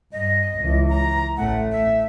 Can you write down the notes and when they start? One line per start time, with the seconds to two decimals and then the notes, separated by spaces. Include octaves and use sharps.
0.12 G2 D#5
0.58 C#2 E3
0.89 A#5
1.37 A1 A3 F#5
1.71 E5